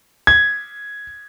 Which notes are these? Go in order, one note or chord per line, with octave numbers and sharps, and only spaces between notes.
G#6